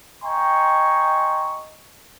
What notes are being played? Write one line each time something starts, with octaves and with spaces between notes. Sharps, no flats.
D#5 G5 G#5 A#5 C6 C#6